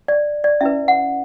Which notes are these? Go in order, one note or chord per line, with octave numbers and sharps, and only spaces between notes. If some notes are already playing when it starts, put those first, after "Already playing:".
D5
D5
C#4 E4 B4 E5
F#5